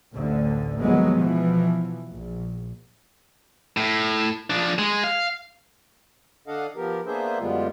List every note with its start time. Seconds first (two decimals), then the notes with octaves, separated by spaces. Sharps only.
0.14 A1 D2 D3
0.80 D#2 F3 F#3 G#3 B3
1.19 B2 E3 F3
2.10 A#1
3.77 A2
4.50 F3 D4
4.78 G#3
5.04 F5
6.48 D3 D4 A4 D#5 F5 F#5
6.76 F3 B3 G4 A#4
7.06 A#3 B3 D4 G#4 C5 E5
7.40 F#2 D3 G3 G#3 B3 F4